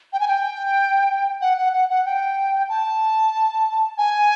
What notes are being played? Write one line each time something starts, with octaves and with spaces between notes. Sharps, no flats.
G5
G#5
G5
F#5
F#5
F#5
F#5
G5
A5
G#5